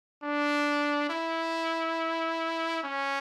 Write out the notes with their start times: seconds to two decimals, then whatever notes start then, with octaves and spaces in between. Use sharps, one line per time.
0.23 D4
1.09 E4
2.83 C#4